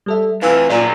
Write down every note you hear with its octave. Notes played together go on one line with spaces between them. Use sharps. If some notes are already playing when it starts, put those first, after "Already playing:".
G3 A4 E5
F2 C3 E3 F5 E6 F6
A#2 F#3 A#3 D5